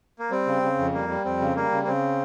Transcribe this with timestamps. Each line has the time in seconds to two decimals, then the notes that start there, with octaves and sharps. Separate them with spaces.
0.19 A#3
0.31 G3 C4
0.47 C#3
0.63 C#3
0.79 F2
0.93 G3 A#3
1.09 G3
1.25 F2 C4
1.40 C#3
1.56 G3 A#3
1.71 C#3
1.83 A#3
1.87 C#3 C4